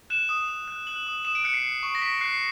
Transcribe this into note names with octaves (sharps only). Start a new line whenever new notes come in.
F#6 E7
D#6
D#6
F#6
F#6 F#7
D#6
D#6 E7
D7
F#6 C#7
C7
F#6
C#6
A#6
C#6 B6
F#6 C7